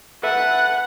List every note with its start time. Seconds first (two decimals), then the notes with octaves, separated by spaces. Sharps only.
0.23 A4 B4 E5 F#5